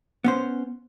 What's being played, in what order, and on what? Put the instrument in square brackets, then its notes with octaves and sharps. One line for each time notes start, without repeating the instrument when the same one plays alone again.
[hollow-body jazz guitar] B3 C#4 C5